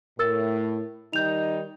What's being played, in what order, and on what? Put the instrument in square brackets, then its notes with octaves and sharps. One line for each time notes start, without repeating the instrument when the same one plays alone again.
[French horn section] A2 [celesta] A#4 E6 A6
[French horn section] D#3 G3 D#4 [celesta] G6 F7